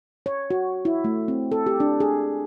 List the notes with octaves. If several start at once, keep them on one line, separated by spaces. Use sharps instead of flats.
C#5
F#4
E4
A3
C4
A4
G4
D4
G#4